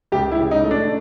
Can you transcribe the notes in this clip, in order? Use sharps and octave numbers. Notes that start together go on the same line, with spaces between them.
C#2 G4
E4
C#3
D#4
A3
D4